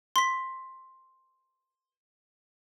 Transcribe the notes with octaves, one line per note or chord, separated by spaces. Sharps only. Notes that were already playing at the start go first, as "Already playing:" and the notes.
C6 B6